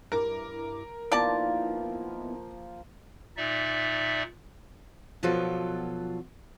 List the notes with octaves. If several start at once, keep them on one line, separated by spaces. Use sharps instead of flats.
G2 E4 A#4 D6
F3 A#3 B3 D#4 E4 D5 A5
A#2 D#4 D5 E5
B2 F3 F#3 B3 F4 A4